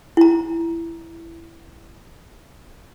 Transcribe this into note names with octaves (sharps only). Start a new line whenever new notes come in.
E4 A#5